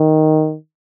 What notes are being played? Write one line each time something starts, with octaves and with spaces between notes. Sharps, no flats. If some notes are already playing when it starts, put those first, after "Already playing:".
Already playing: D#3